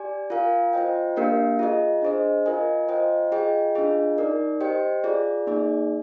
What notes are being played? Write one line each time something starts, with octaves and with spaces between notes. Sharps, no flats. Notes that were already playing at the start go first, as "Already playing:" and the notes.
Already playing: G4 D5 G#5
F4 A#4 F5 G#5
F4 C5 D#5 G5
A#3 D4 G4 A#4 F5
F4 G#4 D#5
D4 G#4 C5 D#5
F4 A#4 D#5 G#5
F4 C5 D#5 G5
F4 G#4 D#5 G5
D4 F4 G#4 D#5
D#4 A#4 D5
G4 C5 D#5 G5
F4 G#4 D5
A#3 D#4 G#4 D5